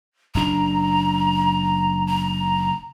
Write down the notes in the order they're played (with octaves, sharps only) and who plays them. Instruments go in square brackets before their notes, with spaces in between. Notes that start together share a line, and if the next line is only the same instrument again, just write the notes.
[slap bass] F#1 D4 [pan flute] A#5
[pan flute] A#5